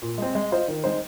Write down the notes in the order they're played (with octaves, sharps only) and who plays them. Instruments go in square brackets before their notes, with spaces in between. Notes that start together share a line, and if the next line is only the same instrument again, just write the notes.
[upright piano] A#2
G#3 C4
G#3
F4 C5 D#5
D#3
G#3 D#4 C5